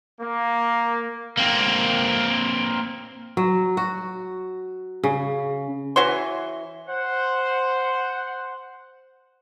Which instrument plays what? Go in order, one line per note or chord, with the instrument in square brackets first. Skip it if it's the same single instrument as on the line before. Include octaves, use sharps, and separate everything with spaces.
[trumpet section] A#3
[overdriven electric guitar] A#3 C4
[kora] F#3
F#4
C#3
[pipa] E3 F#4 C#5 C6
[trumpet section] C5 [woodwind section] F#5